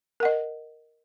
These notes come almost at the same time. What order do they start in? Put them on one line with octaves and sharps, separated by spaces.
A#4 F#5 D#5